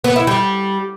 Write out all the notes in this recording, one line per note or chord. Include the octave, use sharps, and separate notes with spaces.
B3
E4
G3